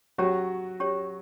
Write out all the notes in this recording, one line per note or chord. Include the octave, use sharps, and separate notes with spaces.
F#3 C#4 F#4 G4 C#5
C#4 G4 C#5